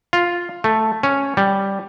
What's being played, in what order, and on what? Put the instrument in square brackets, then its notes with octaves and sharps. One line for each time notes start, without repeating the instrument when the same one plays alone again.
[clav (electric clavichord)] F4
A3
C#4
G3